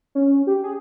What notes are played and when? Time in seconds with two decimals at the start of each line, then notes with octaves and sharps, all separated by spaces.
0.15 C#4
0.47 G4
0.64 G#4